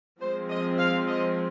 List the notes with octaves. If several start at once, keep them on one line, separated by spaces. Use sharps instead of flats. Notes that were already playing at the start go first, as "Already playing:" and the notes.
F3 G#3 C4 C5
D#5
F5
D#5